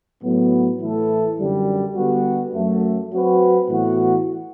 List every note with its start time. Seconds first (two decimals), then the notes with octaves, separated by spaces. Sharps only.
0.23 A2 F#3 B3
0.80 A2 E3 A3 E4 A4
1.38 F#2 D3 G3
1.96 D3 G3 B3 F#4
2.54 F#2 F#3 A3
3.12 F#3 C4 F#4 B4
3.70 A2 E3 B3 F#4